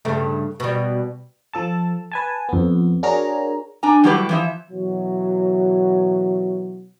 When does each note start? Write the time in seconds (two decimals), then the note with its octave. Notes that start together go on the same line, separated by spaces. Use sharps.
0.05 G2 C#3 A3
0.60 B2 G3
1.53 F3 A4 A5
2.12 B4 G#5 A5
2.49 F2 B3
3.03 D4 F#4 G#4 A#4 C#5 A#5
3.83 D4 G#5 A#5
4.04 A2 F#3 G3 E4 G4 B4
4.29 E3 F3 E5
4.69 B2 E3 F#3